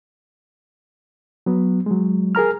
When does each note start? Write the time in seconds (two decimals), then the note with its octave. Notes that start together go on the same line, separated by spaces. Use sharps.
1.46 F#3 B3
1.86 F#3 G#3
2.35 G#4 A#4 A#5 F6